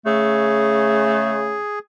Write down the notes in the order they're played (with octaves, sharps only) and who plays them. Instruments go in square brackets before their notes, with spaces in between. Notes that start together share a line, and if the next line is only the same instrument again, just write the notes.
[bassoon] C#3 [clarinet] A3 [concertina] G#4